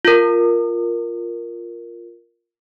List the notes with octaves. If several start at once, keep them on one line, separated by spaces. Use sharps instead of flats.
F4 A#4